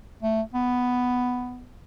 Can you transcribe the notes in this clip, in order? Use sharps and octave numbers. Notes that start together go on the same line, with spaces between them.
A3
B3